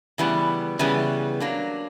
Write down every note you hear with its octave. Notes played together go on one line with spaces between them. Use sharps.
C#3 E3 G3 B3
C#3 E3 G3 B3
F#3 A#3 D4